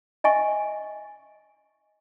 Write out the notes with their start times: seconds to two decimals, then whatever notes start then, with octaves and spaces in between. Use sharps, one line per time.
0.24 D#5 E5 G#5 C#6